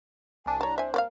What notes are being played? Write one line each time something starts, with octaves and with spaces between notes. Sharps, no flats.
C2 D4 G#5
C#5 A5 A#5
C5 E5 G#5
A#3 D5 F5